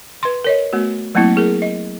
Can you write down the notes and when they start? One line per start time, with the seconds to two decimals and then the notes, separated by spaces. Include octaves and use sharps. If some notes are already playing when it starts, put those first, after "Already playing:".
0.23 B4 C6
0.44 A#4 C#5 D#5
0.73 A3 B3 F#4
1.15 F#3 A3 A#3 C4 E4
1.36 E4 G#4 A#4
1.62 D#5